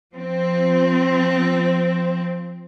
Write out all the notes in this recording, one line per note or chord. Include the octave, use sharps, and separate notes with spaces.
F3 C4